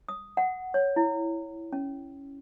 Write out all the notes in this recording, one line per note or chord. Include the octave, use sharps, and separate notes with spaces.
D#6
F#5
C#5
E4
C#4